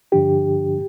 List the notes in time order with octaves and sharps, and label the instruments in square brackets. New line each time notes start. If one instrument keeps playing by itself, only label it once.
[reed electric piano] G2 D3 F3 D4 G4